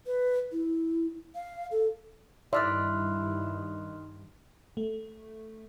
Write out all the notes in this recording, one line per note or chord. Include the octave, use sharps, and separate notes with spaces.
B4
E4
F5
A4
G2 D#3 E4 D5 E5 C6 F6 F#6
A3